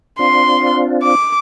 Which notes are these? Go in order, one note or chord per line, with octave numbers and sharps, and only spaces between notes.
C4 D4 F4 C6
D6